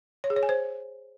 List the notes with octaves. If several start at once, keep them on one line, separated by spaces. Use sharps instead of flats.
C#5
G#4
C#5
G#5
C5